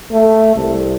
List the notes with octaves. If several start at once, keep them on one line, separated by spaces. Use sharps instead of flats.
A3
C2